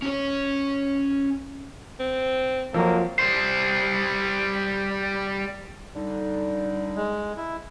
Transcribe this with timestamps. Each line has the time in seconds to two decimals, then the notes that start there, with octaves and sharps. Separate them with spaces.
0.02 C#4 C#5
1.99 C4
2.74 F2 F3 F#3 A#3
3.19 G3 C5
5.96 D3 G3 D#4
6.96 G#3
7.37 E4